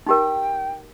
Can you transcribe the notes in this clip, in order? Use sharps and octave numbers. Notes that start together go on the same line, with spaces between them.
D#4 G4 A#4 G5